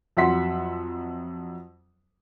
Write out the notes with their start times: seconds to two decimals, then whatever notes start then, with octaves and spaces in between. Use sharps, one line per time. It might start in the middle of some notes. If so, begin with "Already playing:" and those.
0.17 F2 F#3 E5 F#5 C6 B6